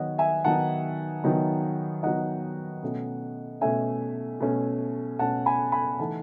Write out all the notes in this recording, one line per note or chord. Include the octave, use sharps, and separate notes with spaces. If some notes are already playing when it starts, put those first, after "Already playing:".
Already playing: D#3 F#3 B3 D#4 C#5 D#5 F#5
E5 G#5
D#3 F#3 B3 D#4 F#5 A5
D#3 F#3 B3 D#4
D#3 F#3 B3 D#4 D#5 F#5
B2 A3 C#4
B2 A3 C#4 E5 G#5
B2 A3 C#4
B2 A3 C#4 F#5 A5
G#5 B5
G#5 B5
E3 A3 D#4 F#5 A5